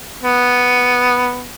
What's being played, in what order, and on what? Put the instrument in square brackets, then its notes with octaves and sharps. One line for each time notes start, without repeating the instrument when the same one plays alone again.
[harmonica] B3